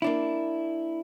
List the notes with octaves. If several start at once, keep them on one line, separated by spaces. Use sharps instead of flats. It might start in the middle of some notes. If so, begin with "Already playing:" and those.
A#3 D4 E4